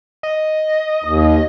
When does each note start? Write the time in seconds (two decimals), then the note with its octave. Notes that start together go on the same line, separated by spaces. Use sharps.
0.23 D#5
1.04 D#2